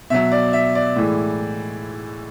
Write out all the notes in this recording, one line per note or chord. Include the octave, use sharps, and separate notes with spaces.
B2 F#3 E5
D5
E5
D5
A2 E3 G#3